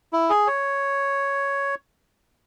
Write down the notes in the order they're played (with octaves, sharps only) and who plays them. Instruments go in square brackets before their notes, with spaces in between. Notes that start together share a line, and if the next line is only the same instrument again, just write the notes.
[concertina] E4
G#4
C#5